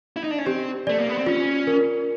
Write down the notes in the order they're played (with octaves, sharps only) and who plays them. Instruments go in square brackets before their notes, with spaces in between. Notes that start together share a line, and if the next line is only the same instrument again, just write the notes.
[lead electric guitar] E4
D#4
D4
C#4
[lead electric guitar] C4 [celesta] G4
[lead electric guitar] A3 [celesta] D5
[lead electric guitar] A#3
B3
C4
[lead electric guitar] C#4 [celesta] F4
[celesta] A#4